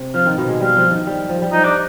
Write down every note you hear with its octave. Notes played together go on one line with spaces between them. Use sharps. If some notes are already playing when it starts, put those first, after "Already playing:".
Already playing: C3
F3 F4
D#3
B2
G#3
G3 F4
F3
D#3
G3
F3
G3
F3 D#4
D4